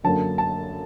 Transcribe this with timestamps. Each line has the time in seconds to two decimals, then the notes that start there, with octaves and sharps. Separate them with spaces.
0.04 F#2 D3 F#3 A#3 A5
0.38 A5